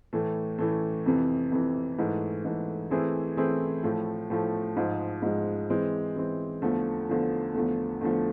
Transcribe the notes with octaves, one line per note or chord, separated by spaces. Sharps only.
A2 E3 A3
A2 E3 A3
F2 C3 E3
F2 C3 E3
G#2 E3 A3
G#2 E3 A3
E3 A3 C4 E4 G#4
E3 A3 C4 E4 G#4
A2 F3 A3
A2 F3 A3
G#2 F3 G#3
G#2 F3 G#3
E3 G#3 C4
E3 G#3 C4
E2 D3 F3 A3
E2 D3 F3 A3
E2 D3 F3 A3
E2 D3 F3 A3